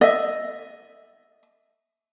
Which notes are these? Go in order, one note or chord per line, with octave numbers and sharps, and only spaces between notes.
D#5 E5